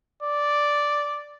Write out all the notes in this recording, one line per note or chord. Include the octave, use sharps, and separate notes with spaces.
D5